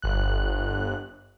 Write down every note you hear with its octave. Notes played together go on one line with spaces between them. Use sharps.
G1 F#6